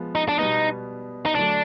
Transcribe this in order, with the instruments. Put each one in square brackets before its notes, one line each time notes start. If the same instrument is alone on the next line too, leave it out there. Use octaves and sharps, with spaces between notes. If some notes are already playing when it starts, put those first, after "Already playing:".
Already playing: [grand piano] F3 G#3 B3
[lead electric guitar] D#4
D4
[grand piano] B2 G3 B3 [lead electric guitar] D#4
[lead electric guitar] D#4
[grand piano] D3 F#3 A3 [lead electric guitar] D4